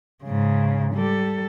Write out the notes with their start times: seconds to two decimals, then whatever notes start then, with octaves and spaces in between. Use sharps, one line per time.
0.23 G#2 C#3
0.94 G3 A4